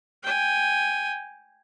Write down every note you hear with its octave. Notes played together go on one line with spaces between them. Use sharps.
G5 G#5